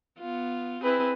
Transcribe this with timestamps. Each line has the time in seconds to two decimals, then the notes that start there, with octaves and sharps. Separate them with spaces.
0.19 B3 F4
0.82 C4 E4 G#4 B4